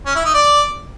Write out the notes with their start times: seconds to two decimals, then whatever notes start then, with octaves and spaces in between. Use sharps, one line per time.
0.06 C#4
0.15 E4
0.25 D#4
0.34 D5